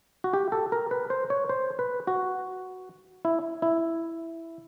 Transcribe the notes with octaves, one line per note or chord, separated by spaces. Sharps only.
F#4
G4
A4
A#4
B4
C5
C#5
C5
B4
F#4
E4
E4